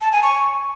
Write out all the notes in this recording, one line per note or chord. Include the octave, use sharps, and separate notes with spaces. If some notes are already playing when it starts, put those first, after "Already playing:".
A5
G#5
C#6